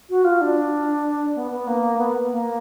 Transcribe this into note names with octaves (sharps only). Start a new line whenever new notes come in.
F#4
F4
D4
B3
B3
A#3
B3
A#3